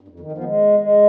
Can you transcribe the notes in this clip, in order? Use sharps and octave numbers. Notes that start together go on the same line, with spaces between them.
G2
F2
D#3
F3
B3
G#3
G#3